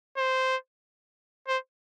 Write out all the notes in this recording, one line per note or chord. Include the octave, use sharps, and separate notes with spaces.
C5
C5